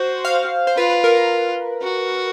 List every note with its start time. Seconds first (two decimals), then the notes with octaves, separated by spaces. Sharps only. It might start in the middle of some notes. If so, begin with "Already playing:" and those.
Already playing: F#4 C5
0.25 F5
0.67 C5
0.77 F4 B4
0.90 B4
1.04 A#4
1.17 A#4
1.82 F#4